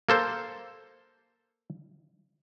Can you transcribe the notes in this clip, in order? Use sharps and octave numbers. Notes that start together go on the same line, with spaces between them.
A#3 A4 C5